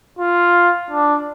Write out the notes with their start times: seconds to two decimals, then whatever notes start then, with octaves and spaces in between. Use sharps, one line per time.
0.19 F4
0.91 D4